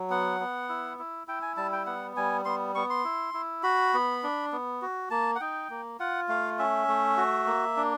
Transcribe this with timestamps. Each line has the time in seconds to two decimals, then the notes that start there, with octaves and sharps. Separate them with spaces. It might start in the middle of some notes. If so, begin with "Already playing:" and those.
Already playing: F#3
0.10 B3 F#5
0.40 B3
0.69 E4
0.99 E4
1.27 E4 G5
1.42 G#5
1.57 G3 A5
1.72 G5
1.86 B3 F#5
2.17 G3 G#5
2.45 B3 C6
2.75 B3 C#6
2.90 C6
3.05 E4
3.34 E4
3.63 F#4 B5
3.94 B3
4.23 D4
4.52 B3
4.82 F#4
5.10 A#3 A5
5.36 F#5
5.40 D#4 G5
5.70 A#3
5.99 F4 F#5
6.28 A3 F5
6.59 C#4 E5
6.88 A3
7.17 F#4
7.46 A#3
7.77 D4